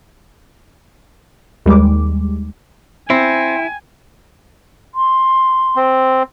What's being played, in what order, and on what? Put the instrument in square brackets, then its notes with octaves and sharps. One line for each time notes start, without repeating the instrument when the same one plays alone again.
[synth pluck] D#2 G3 G#3 D6
[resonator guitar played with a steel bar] C4 [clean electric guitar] E4 [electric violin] G#5
[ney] C6
[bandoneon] C4